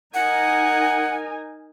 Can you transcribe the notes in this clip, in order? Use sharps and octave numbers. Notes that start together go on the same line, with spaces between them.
D#4 A#4 F#5 G#5